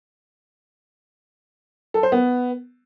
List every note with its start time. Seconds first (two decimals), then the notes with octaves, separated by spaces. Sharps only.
1.94 A4
2.03 C5
2.12 B3